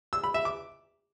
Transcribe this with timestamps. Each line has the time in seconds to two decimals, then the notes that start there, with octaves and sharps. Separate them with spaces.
0.13 E6
0.24 B5
0.34 E5
0.45 D6